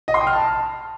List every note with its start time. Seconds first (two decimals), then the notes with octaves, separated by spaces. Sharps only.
0.08 D#5
0.14 C6
0.21 G5
0.27 F6
0.33 A5